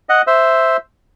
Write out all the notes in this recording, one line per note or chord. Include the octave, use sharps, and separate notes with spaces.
D#5 F#5
C5 E5